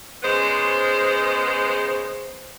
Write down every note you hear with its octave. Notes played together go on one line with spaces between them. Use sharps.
C#3 G#3 B3 C5